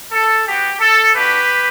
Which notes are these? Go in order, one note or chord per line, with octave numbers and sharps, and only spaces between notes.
A4
B3 F#4 G4
A4
A3 D4 F#4 G4 B4